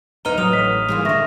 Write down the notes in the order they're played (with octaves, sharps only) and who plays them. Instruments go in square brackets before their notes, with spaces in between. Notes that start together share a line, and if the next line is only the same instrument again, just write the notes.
[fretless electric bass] D1 [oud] C3 D#4 [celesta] B4 A#5 [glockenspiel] F6 D#7 G7
[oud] E2 A2 [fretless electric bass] F#3 [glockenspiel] D#6 F7
[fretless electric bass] A1 [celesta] B6
[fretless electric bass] G#2 E3 [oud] G3 G#3 A#3
[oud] A#2 D#3 [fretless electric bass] D3 [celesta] E5 C#6 A#6